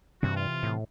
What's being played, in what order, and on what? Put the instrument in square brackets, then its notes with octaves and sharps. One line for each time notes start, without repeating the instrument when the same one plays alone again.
[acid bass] G2 [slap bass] C3 E3 C4 [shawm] F#4
[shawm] F4
[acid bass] A2